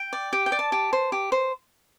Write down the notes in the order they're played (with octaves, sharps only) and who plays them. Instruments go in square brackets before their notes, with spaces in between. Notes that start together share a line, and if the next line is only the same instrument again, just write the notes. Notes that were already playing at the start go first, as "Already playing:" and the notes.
Already playing: [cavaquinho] G5
D5
G4 G5
G5
D5
A5
G4
C5
G4
C5